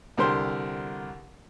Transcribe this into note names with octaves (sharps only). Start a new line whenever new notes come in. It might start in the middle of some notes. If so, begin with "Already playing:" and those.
C2 D3 G4 A#4 C5 C6